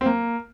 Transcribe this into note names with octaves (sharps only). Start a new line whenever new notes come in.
C4
A#3